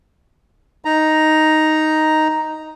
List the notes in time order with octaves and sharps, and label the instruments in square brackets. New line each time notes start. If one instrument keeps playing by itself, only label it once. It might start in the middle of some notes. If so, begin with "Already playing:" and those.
[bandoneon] D#4 A#5